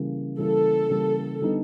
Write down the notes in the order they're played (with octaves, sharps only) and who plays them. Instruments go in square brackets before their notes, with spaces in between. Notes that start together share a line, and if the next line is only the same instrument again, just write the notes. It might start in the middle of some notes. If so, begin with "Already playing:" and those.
Already playing: [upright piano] C#3 E3 G3 A#3
[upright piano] C#3 E3 G3 A#3 [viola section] A4
[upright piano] C#3 E3 G3 A#3
D3 G3 B3 D#4